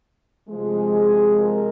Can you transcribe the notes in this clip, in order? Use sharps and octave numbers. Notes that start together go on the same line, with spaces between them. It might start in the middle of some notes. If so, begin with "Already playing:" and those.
C3 F3 G#3
G#4
A#4